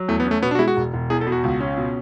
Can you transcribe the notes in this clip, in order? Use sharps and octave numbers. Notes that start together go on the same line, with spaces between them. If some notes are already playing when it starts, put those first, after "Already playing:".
Already playing: F#3
E2 A3
B3
C#4
A3
B2 B3
D4
F#4
G#3 E4
F#4
E1
E1
E2 G#4
A4
B2
F#4
C#2
C#4
B2